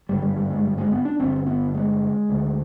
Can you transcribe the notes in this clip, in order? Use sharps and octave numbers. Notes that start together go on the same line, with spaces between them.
G#1 G2 D3 G3
G3
G3
G#3
G3
G#3
B3
D4
G1 G2 D3 C4
B3
G#3
D2 D3